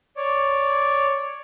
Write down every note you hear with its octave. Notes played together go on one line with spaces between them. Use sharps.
C#5 D5